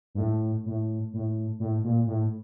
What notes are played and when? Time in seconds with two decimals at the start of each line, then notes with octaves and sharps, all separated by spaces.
0.15 G2
0.18 A2
0.66 A2
1.14 A2
1.60 A2
1.84 A#2
2.07 A2